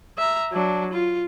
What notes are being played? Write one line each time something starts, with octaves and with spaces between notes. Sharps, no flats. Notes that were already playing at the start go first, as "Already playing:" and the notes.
E5 A#5
F#3 D4
F4